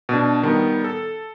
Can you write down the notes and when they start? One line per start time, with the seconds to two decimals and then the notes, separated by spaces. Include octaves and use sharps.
0.09 B2 D4
0.43 D#3 G3 B3
0.84 A4